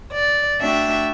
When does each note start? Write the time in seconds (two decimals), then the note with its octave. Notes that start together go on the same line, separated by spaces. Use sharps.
0.13 D5
0.60 A3 D4 F#4 E5 G5